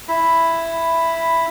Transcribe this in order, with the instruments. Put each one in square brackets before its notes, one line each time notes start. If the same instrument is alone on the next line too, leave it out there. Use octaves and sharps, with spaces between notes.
[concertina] E4 B5